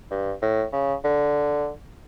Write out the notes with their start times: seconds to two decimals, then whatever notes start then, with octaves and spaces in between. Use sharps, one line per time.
0.11 G2
0.42 A2
0.73 C#3
1.04 D3